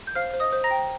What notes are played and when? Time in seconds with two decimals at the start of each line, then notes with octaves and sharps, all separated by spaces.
0.07 G6
0.15 C5 F5 F6
0.34 C5
0.40 D#5 D#6
0.53 C5
0.64 A#5 A#6
0.71 G5